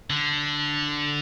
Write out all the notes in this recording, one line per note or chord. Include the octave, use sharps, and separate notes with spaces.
D3